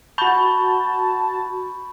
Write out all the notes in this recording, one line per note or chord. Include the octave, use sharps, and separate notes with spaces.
F#4 A5 B5 C#6 G6